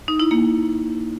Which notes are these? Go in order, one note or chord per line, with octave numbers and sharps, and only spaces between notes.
D#4
E4
A#3